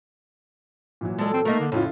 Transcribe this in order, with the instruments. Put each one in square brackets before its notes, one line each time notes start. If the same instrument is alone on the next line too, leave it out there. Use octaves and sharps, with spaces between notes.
[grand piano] A#2 E3 F#3
[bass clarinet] G#3 [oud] A4 D5
[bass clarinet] C4
[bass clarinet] A3 [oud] A#3 D#4 A#4
[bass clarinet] D3
[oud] F2 [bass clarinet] A2 [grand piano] C#3 E4 F4